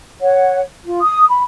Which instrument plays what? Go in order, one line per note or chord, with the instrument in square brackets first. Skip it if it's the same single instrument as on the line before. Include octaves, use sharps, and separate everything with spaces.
[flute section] C#5 F#5
F4
D#6
B5